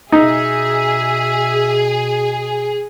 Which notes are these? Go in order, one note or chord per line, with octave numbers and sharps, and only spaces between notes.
B2 D#4 G#4 E5